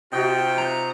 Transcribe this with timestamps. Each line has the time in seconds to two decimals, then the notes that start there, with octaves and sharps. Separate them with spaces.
0.12 C3 D#4 F4 F#4 G5
0.58 A#5